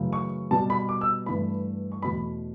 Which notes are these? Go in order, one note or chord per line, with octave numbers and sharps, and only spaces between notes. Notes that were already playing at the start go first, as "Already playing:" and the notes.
Already playing: F#2 C#3 E3 A3
C#6
B2 G3 A5
B5
D6
E6
G2 E3 A3 B5
C#6
E2 B2 A3 B5